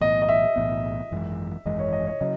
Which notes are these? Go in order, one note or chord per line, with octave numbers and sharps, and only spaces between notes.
B1 A2 E3 B3 D#5
D#5
E5
B1 A2 E3 B3
G#1 F#2 E3 G#3
G#1 F#2 E3 G#3 D#5
C#5
D#5
C#5
C#3 F#3 D#5